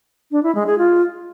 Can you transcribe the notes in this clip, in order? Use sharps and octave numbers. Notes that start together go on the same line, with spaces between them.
D4
E4
G#3
G#4
F4